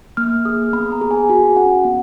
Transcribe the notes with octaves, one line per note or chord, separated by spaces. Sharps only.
A#3 F6
G#4 D#6
B3 B5
A#5
G#4
G#5
F#4 G#5
C#4 F#5
B3